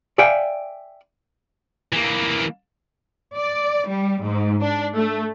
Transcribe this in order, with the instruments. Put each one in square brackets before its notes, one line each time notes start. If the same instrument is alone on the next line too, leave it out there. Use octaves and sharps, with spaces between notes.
[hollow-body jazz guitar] D5 E5 F5 G5 G#5
[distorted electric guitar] E3 A#3
[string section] D5
G3
G#2
D4
A3